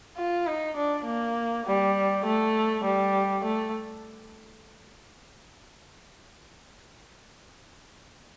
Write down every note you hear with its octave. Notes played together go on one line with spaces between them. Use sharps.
F4
D#4
D4
A#3
G3
A3
G3
A3